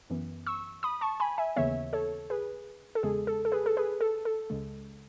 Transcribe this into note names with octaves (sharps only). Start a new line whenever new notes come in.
F#2 E3 B3
C#6 E6
B5 D#6
A5 C#6
G#5 B5
E5 G#5
D#2 C#3 E3 B3 C#5 E5
A4 C#5
G#4 B4
A4
E2 C#3 G#3 G#4
A4
A4
G#4 B4
A4
G#4 B4
A4
A4
C#2 C#3 G#3